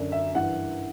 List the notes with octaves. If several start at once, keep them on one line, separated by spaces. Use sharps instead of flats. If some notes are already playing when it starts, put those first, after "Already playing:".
Already playing: F#2 D3 D5
E5
G2 E3 F#5